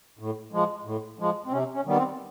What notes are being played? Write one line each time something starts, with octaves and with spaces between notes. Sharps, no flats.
A2
F3 G#3
A2
F3 G#3
C4
C3 C#4
C#4
D#3 G3 B3
C4